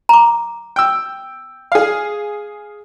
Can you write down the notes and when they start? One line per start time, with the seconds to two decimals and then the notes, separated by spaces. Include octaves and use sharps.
0.09 A#5 D6
0.76 G5 E6
1.72 G#4 F5